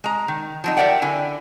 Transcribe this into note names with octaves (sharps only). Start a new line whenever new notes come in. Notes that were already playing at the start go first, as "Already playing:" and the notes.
G#3 A#5
D#3
F3 F#3 D#4
G4 A#4 D5 E5 F#5 G5
D3 E4 G#5